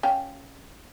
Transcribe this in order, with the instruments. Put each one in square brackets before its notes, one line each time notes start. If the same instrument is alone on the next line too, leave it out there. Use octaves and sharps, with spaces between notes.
[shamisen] C#4 F5 G5